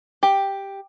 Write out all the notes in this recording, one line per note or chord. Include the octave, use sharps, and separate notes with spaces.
G4